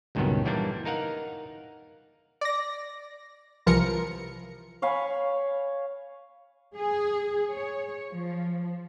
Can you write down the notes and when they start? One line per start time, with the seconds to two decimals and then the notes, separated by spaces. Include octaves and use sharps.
0.15 C#2 G2 A#2 D#3 F#3 B3
0.45 E3 G3 A#3 D4
0.85 D#4 A#4 F5 F#5
2.41 D5 A#6
3.66 C2 E3 F3 A#4 C#7
4.82 C#5 F5 G#5 B5
6.75 G#4
7.51 C#5
8.12 F3